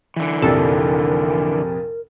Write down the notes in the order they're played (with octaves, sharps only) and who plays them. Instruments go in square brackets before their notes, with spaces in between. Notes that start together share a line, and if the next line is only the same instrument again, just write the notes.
[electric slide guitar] D3 E3
[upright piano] A#1 F2 C3 [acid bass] A4 [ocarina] A#4